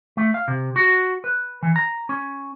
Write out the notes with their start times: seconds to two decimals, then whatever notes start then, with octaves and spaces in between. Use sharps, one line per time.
0.17 A3
0.34 F5
0.48 C3
0.76 F#4
1.24 B4
1.63 E3
1.76 A#5
2.09 C#4